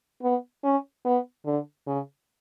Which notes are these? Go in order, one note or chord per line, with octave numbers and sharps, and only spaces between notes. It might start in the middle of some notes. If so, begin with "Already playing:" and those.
B3
C#4
B3
D3
C#3